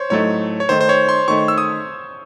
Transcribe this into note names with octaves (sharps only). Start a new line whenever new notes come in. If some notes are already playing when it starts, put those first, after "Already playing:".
Already playing: C5 C#5
A2 F#3 A3 D#4 C#5
C#5
D#3 A3 D#4 C5
C5
C#5
C6
D#3 A3 D#4 C#6
E6
D#6